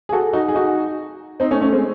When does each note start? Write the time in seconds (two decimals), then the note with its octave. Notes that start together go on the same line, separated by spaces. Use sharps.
0.09 G#4
0.12 F#4 A4
0.33 D#4 F#4
0.48 G#4
0.55 D#4 F#4
1.40 C4 D#4
1.51 A3 C#4
1.61 A3 C#4
1.72 G#3 C4